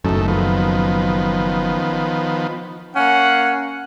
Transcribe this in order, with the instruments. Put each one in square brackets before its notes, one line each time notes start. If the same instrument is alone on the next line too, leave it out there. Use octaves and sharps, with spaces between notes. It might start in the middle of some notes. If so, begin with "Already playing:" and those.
[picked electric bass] F#1 F#2 [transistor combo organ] A2 D#3 A3
[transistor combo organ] D#3 F3 B3
[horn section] A#3 C#4 F5 F#5